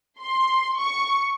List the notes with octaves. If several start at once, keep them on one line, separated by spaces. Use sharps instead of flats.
C6
C#6